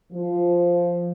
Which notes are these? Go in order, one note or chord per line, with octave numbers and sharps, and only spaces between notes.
F3